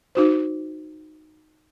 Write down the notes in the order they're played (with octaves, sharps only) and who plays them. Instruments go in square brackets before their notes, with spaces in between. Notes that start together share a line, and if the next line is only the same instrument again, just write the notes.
[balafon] D#4 F#4 C5